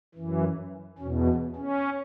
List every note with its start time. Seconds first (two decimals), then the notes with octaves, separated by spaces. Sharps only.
0.15 F#2 E3
0.98 E2 B2 C#4
1.27 B3
1.56 C#4